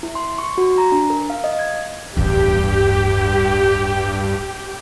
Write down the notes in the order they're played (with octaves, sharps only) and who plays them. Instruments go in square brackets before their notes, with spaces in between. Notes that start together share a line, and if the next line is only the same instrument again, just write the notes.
[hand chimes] E4
C6
C#6
F#4
A#5
D4
A#4
F5
D#5
G#6
[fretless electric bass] D1 A1 E2 [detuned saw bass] G2 [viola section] G4